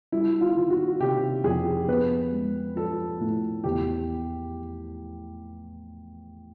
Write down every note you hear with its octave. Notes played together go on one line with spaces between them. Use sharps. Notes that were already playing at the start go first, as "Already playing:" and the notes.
G3 E4
F4
D#3
F#4
C3 G4
F2 G#4
B3 B4
G#3
F3 A4
A2
E2 G4